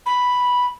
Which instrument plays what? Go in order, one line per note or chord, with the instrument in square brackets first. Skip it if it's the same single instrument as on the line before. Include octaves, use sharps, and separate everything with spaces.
[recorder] B5